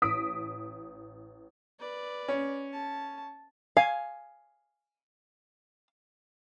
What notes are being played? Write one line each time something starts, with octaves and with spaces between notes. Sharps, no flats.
A1 D#6 B6 D7
B4 D5
C#4
A5
F5 G#5